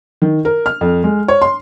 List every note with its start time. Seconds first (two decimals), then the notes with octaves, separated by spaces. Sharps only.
0.22 D#3
0.45 A#4
0.66 F6
0.81 F2
1.04 G#3
1.28 C#5
1.42 C6